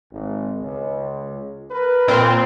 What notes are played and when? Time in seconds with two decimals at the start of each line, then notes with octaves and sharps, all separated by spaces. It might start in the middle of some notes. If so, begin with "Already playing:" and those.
0.12 G#1
0.61 C#2
1.71 A#4 B4
2.08 A#2 C4 F4